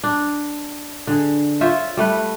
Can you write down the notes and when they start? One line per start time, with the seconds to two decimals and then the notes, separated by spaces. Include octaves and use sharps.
0.04 D4
1.07 D3 G#4
1.61 F4 C5 C#5 E5
1.97 G3 A3 B4